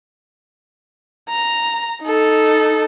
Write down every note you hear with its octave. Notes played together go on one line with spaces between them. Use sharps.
A#5
D#4 A4